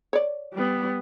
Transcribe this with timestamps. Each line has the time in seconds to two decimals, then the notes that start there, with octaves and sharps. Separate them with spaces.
0.13 C#5 D5
0.53 G3 B3